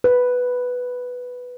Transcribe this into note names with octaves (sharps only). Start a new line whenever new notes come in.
B4